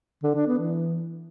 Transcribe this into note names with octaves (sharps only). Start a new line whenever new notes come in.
D3
D4
B3
E3